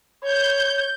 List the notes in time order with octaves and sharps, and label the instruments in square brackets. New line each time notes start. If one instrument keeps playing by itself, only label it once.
[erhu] C#5 [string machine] G6